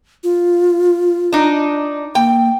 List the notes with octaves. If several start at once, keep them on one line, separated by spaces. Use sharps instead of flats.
F4
D4 D#4
A#3 G5